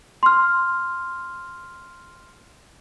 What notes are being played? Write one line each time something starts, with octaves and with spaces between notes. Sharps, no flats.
C6 F6